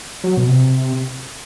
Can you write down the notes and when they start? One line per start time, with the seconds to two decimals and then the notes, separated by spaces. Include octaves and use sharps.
0.24 F#3
0.37 B2
0.49 C3